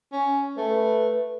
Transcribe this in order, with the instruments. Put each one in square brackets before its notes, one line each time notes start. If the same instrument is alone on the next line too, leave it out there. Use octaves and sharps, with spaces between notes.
[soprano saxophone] C#4
[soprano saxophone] A3 [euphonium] B4